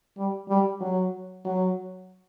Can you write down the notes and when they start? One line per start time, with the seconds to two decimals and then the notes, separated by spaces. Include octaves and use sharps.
0.18 G3
0.49 G3
0.81 F#3
1.45 F#3